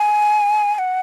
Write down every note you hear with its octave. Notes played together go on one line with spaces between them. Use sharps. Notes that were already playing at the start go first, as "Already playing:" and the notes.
Already playing: G#5
G#5
F#5